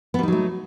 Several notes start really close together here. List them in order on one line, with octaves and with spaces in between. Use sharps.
B3 G3 D#4 F#3 A3